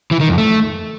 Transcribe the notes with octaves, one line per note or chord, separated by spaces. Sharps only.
E3
D#3
F2
A3